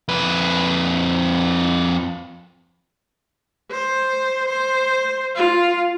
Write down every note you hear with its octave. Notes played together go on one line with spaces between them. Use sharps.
F2 B4
C5
C5
F4